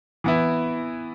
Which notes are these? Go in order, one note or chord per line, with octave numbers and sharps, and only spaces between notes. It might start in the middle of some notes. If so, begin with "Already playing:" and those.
E3 B3 E4